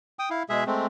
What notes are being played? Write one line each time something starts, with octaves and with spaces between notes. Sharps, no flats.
G5 D#6
E4 F5
B2 G#3 G#4 E5
G#3 A3 C4